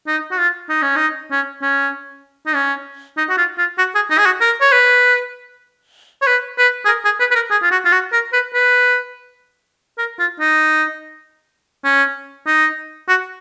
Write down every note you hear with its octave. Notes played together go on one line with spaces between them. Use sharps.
D#4
F#4
F4
D#4
C#4
D#4
C#4
C#4
D#4
C#4
D#4
F#4
F4
F4
F#4
G#4
D#4
G#4
F#4
A#4
C#5
B4
C#5
B4
B4
G#4
A#4
G#4
B4
B4
A#4
G#4
F4
F#4
F4
F#4
A#4
B4
B4
A#4
F4
D#4
C#4
D#4
F#4